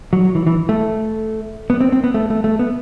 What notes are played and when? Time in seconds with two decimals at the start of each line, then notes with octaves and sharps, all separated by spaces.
0.13 F#3
0.35 E3
0.47 E3
0.69 A3
1.70 B3
1.80 C4
1.92 C4
2.04 B3
2.14 A3
2.30 A3
2.44 A3
2.59 B3